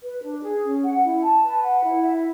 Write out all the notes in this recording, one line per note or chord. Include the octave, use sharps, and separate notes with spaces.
B4
D4
G#4
C#4
F#5
E4
A5
B4
F#5
E4
E5